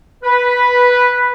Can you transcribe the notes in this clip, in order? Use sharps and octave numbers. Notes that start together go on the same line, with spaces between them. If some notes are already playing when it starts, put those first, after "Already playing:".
B4